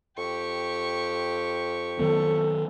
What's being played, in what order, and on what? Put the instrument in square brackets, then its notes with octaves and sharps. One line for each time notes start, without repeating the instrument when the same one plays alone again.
[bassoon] F2 [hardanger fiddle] G4 C#6
[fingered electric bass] D#3 F#3 B3 [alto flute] A4